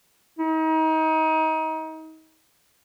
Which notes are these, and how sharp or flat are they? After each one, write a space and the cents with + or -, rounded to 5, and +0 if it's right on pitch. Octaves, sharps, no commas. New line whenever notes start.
D#4 +30